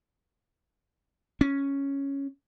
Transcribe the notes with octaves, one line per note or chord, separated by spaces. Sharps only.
C#4